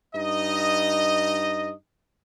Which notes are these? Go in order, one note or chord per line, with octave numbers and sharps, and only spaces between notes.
G2 D#4 D#5